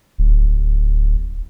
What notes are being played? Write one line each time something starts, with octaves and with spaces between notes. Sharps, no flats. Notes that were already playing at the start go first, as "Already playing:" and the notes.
D1